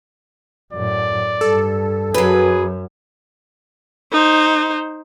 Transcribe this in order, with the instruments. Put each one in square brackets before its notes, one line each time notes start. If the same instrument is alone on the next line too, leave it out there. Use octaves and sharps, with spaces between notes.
[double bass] F#2 A2 [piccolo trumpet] D5
[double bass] G2 [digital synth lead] A4
[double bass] F#2 [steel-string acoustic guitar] F#3 B4 [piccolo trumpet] G#4
[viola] D#4 C5